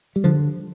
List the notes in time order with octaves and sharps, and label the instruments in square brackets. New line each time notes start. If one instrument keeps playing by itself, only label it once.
[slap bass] G3
D3 F3